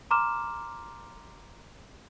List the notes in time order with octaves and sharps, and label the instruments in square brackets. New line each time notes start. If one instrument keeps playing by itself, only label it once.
[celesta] A#5 C6 D6 F6 E7